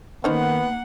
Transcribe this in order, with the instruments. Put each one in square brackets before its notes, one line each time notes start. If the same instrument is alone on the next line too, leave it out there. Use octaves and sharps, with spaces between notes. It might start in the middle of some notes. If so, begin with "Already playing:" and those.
[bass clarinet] D#3 [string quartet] A#3 F#5 [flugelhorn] B3 [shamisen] C#4 D#4 C5